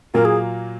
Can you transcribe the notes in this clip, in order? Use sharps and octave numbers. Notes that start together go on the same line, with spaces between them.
A#2 F#3 A#3 F4 A#4
G#4